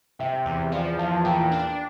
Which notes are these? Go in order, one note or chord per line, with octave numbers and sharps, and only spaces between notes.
C3 E5 G5
E2
F3 D5 F5
E2 F5 A5
F5 A5
A#2 G5 A#5
D4